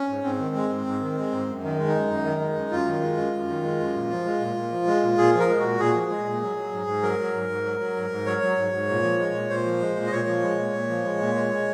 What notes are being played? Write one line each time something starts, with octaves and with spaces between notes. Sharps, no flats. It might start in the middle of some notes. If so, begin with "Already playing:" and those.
Already playing: C#4
G#2
G#2 C4
D#3
G#3
G#2
G#2
D#3
G#3
G#2
F#2
D#3
G#3
D#4
F#2
F#2
D#3
G#3
F#2
F#2 F4
D#3
G#3
F#2
F#2
D#3
G#3
F#2
A#2
F3
G#3
A#2
A#2
F3
G#3
A#2
A#2 G#4
F3
A#4
G#3
A#2 F#4
A#2 G#4
F3
G#3
A#2
F#3
F#3
G#2
G#2
F#3 A#4
F#3
G#2
G#2
F#3
F#3
G#2
G#2
F#3 C#5
F#3
G#2
G#2
A#2
F3
G#3
A#2
A#2 C5
F3
G#3
A#2
D#5
A#2 C#5
F3
G#3
A#2
A#2
F3
G#3
A#2
G#3
G#3